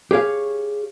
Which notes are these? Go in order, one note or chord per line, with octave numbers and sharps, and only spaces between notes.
G4 G#4 C#5 F5